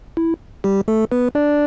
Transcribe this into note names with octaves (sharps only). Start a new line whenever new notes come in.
E4
G3 G4
A3 A4
B3 B4
D4 D5